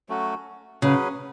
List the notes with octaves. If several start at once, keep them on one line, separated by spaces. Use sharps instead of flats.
F#3 A3 C#4 F#4
C#3 F#3 C#4 G#4 B4